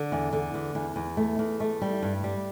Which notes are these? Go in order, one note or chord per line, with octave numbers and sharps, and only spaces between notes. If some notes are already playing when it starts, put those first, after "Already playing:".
Already playing: D3
E2
D3
E2
E2
E2
A3
E2
A3
G3
G2
G3